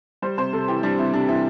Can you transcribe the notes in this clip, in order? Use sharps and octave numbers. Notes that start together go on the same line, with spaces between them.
G3 C5
C3 C5
C3 A4
E3 G4
G3 D4
C3 E4
C3 D4
E3 E4